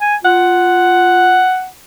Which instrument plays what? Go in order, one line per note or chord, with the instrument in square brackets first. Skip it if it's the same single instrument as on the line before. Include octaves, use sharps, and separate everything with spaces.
[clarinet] G#5
[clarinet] F4 [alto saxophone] F#5